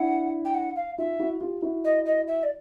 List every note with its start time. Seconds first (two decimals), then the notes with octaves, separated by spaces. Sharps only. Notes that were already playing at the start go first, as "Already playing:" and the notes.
Already playing: D4 E4 F#5
0.45 G5
0.54 F#5
0.76 F5
0.98 D#4 F4 E5
1.20 E4 F#4
1.41 F4 G4
1.62 E4 F#4
1.84 D#5
2.06 D#5
2.27 E5
2.43 D5